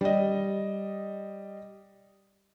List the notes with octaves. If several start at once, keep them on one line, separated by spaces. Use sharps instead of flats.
G3 D#5